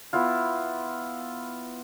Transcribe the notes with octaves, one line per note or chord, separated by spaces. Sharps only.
B3 E4 F4